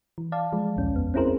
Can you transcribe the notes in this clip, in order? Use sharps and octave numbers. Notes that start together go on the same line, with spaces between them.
E3
D5 F5 A5
F3 G#3
A#1 D#2 C#4
F2 B3
C4 C#4 E4 G#4 A#4 C5